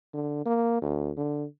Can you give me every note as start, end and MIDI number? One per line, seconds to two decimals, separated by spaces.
0.14 0.41 50
0.46 0.77 58
0.82 1.11 38
1.17 1.45 50